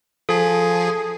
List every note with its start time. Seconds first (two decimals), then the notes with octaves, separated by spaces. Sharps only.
0.29 F3 G#4 A4